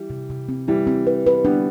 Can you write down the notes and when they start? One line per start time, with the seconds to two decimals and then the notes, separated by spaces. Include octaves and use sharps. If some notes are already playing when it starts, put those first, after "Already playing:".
Already playing: E3 G3
0.10 C3
0.30 C3
0.49 C4
0.68 E3 G3 E4
0.87 C4
1.07 B4
1.27 B4
1.45 G3 B3 D4